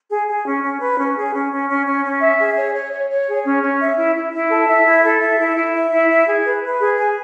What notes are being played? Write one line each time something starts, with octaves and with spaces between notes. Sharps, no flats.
G#4
G#4
C#4
C#4
B4
C#4
G#4
C#4
C#4
C#4
C#4
C#4
E5
G#4
C#5
C#5
C#5
C#5
G#4
C#4
C#4
E5
E4
E4
E4
A4
E5
E4
A4
E5
E4
E4
E5
E4
E5
G#4
B4
B4
G#4
G#5